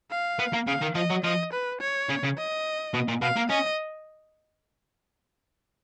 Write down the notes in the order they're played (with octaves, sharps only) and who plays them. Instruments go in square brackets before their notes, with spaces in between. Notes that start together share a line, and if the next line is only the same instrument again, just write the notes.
[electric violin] F5
[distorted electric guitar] B3
A#3
[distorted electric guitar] C#3 [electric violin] F5
[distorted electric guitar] D#3
[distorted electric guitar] F3 [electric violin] D#5
[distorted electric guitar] F#3
[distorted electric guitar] F3 [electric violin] D#5
[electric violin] B4
C#5
[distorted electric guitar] C#3
C#3
[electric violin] D#5
[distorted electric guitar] B2
A#2
[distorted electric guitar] B2 [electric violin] F5
[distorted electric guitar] A#3
[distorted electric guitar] C#4 [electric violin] D#5